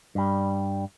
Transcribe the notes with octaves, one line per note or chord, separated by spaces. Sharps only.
G2 G3